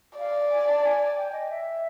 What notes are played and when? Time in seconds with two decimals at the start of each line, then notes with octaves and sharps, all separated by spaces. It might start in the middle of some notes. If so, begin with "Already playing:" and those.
0.19 D5 F5
0.52 G#5
0.67 A5
0.84 G#5
1.17 G5
1.32 D#5
1.50 E5